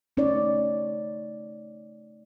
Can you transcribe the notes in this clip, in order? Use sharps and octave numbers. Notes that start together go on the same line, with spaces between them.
A3 C#4 D#4 C#5 D5